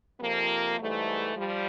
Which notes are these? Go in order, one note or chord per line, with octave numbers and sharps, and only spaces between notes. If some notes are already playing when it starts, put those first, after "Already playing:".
F2 C3 F3 A#3
G#2 E3 G3 A3
F3 G3